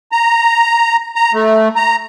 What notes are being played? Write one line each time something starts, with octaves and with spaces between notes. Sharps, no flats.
A#5
A#5
A3
A#5